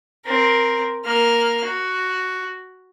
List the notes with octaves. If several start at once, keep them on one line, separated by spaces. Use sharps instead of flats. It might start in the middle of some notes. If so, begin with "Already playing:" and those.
C4 A#4
A#3 F6
F#4